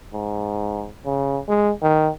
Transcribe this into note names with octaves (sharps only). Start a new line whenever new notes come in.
G#2
C#3
G#3
D#3